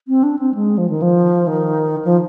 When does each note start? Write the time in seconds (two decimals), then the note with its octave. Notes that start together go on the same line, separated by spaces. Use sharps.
0.08 C4
0.23 D4
0.39 C4
0.54 G#3
0.78 F3
0.89 D#3
1.02 F3
1.47 D#3
2.05 F3